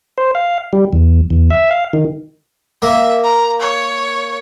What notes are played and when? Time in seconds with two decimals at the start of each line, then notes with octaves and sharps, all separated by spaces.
0.18 C5
0.35 F5
0.73 G3
0.93 E2
1.30 E2
1.50 E5
1.71 F5
1.93 D#3
2.82 A#3 E5
3.24 A#5
3.60 C#5